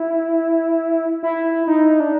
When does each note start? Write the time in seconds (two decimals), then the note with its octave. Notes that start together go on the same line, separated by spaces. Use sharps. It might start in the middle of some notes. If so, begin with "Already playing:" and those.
Already playing: E4
1.23 E4
1.67 D#4
2.00 D4